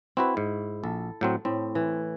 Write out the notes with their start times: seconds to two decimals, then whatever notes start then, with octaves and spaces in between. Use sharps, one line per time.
0.17 C4 E4 F#4 B4
0.37 G#2
0.84 A#1 A4
1.21 A2 F#3 C4
1.45 A2 C4
1.75 E3